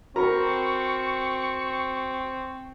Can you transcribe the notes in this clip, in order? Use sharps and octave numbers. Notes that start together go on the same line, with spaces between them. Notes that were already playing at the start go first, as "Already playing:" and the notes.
C4 F#4 A#4 A#5 B5 C#6